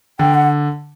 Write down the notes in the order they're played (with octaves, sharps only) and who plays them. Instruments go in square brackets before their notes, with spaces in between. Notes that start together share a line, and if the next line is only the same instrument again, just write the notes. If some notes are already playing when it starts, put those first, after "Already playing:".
[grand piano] D3 [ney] G5
[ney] F#5